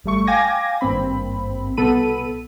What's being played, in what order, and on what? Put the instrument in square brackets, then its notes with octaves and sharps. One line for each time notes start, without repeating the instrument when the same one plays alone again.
[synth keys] G#1 G3 A3 C#6
F5 G5 G#5 D6 G#6 A#6
G#1 G2 A#3 C4 B5
C2 B2 B3 A4 B5 D#7